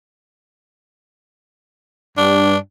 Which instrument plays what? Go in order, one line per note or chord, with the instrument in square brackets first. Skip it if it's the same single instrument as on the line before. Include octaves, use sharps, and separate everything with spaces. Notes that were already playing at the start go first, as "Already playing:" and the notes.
[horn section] G2 [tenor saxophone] D4